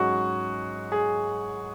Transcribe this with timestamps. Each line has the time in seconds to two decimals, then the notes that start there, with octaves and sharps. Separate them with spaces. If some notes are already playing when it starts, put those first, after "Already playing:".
Already playing: G#2 F#3 C#4 F#4 G#4
0.92 G#4